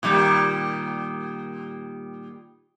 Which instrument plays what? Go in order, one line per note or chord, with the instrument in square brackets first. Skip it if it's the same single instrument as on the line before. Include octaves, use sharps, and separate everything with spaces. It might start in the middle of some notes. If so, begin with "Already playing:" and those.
[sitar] A#2 D#3 G3